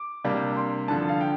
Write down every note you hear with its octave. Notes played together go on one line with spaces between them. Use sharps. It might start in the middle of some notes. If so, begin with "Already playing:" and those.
Already playing: D6
C3 G3 A#3 D4
C6
G2 D3 F3 A5
F5
G5